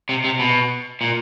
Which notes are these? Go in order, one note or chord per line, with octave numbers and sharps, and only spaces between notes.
C3
C3
B2
A#2